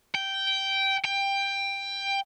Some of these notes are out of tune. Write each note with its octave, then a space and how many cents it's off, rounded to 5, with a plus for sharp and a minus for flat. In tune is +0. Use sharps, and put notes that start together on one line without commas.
G5 -10
G5 +15